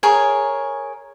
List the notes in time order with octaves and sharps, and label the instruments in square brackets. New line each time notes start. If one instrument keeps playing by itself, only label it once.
[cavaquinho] G#4 A#4 C#5